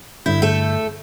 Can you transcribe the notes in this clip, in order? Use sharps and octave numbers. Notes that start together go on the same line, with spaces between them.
G2 D3 E4 G6
A3 A4